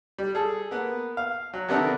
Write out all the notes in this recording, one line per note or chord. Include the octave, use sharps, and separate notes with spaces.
G3
G#4 A4
A#3 B3
F5
F#3
C3 D#3 B3 D4 A4 A#4